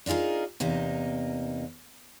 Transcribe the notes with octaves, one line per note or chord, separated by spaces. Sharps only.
D4 D#4 F4 G#4 A#4
E2 C3 A#3 D#4